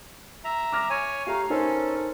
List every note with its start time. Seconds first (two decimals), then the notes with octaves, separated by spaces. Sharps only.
0.44 E5 A#5
0.73 D6 F6 A#6
0.90 C#5 G#5
1.27 A3 G4 A4 F5 A#5
1.50 C#4 D#4 A4 A#4 C5